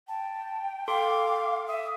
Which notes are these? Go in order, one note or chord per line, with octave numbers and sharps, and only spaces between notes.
G5 A5
A4 F5 C6 D6
E5 D#6